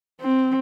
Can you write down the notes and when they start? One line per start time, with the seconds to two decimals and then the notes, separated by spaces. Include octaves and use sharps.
0.21 C4